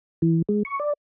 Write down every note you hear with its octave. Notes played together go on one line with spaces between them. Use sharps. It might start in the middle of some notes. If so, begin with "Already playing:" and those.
E3
G#3
C#6
D5